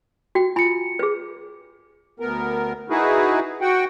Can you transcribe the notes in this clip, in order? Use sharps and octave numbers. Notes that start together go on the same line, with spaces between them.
F#4 G5
F4 G#5 B5 C#7
G#4 B4
D2 B3 A#4
D#4 E4 F#4 G#4 B4
F#4 F#5 G5